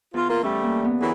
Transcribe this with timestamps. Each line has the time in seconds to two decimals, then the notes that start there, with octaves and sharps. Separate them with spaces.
0.14 E2 F4
0.29 A#3 F4
0.43 G3 A3 C#4 G4 D5
0.63 A#3
0.85 B3
1.00 E3 F#3 G#4 A#4 B4 G5